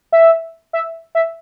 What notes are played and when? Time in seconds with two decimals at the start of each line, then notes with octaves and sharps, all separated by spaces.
0.12 E5
0.73 E5
1.15 E5